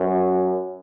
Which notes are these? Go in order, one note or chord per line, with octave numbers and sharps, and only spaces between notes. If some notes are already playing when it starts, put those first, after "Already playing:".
Already playing: F#2